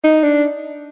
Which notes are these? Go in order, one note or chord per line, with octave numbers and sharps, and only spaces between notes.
D#4
D4